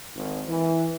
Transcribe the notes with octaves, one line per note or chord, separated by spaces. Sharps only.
G#1
E3